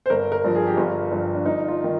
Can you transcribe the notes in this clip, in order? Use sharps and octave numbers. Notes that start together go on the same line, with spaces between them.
C5
G1 A#4
A#4
G2 F3
G#4
G4
G1 F4
G2 F3
D4
G1 D#4
F4
D#3